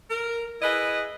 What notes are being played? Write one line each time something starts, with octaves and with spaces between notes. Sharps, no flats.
A#4
E4 G#4 B4 D#5